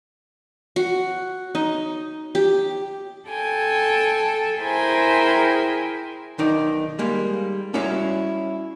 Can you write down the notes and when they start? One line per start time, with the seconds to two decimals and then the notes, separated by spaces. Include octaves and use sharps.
0.76 F#4
1.55 D#4
2.35 G4
3.27 A4 G5 G#5
4.61 E4 G#4 A#4 C5 G5 G#5
6.38 B1 D#3 D#4 D5
6.99 G3 G#3 A#3
7.74 G3 C#4 E4 F#4 C#5 F5